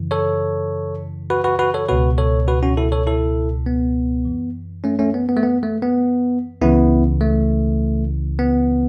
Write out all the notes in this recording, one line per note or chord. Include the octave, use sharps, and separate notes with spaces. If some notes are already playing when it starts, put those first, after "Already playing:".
Already playing: F#2 C#3 E3
A4 C#5
F#4 B4
F#4 B4
F#4 B4
A4 C#5
C#2 B2 F#4 B4
A4 C#5
F#4 B4
C#4 F#4
E4 A4
A4 C#5
E4 A4
B3
F#2 E3
A3 C#4
A3 C#4
B3
B3
A3
B3
A3
B3
C#2 C#3 E3 B3 E4
A3
B3